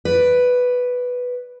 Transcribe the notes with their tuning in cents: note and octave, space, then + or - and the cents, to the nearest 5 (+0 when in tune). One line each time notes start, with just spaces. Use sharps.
B4 +0 D5 +0